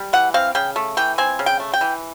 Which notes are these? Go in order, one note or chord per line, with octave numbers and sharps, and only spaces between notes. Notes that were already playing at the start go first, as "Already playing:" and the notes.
Already playing: G3
E3 F#5
C4 F5
C#3 G5
A3
E3 G5
C4 G#5
C#3
G5
A3
G5
E3